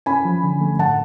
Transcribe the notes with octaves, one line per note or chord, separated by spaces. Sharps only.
C#4 G#5 B5
F3
D3
A3
A2 F#5 A5